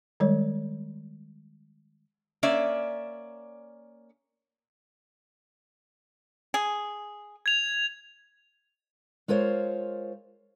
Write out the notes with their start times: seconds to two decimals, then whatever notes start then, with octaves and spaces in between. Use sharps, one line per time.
0.20 D#3 G3 G#3 C#5
2.43 A#3 C#4 D5 E5
6.54 G#4
7.46 G#6 F7
9.28 G#3 F4 A#4 C5 C#5